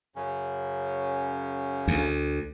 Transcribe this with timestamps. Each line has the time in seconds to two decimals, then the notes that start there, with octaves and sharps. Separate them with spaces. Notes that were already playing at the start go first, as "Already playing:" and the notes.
0.16 F#2 C#3 C#4
1.88 D2